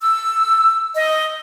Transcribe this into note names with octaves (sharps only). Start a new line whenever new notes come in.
E6
D#5